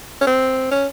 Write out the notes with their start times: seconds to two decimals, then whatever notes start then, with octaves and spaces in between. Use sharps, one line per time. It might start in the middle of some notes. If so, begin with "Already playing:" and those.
0.21 C#4
0.27 C4
0.71 C#4